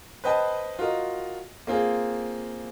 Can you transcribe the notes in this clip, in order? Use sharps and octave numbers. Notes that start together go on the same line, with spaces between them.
B4 C5 D#5 G5 A5
F4 F#4 A#4 D#5
A#3 C4 F4 G#4